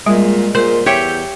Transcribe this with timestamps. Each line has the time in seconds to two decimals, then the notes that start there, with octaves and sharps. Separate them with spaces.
0.06 A#2 G3 G#3
0.55 A#2 A#4 C5
0.86 E2 G4 C#5 E5 G6